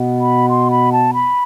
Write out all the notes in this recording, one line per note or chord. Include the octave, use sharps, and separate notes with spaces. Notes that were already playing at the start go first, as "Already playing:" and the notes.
Already playing: B2 B3
B5
C6
B5
A5
B5